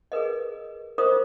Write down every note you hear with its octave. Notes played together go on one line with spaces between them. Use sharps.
G#4 A#4 B4 D#5
F4 A#4 C5 D#5 D6 D#6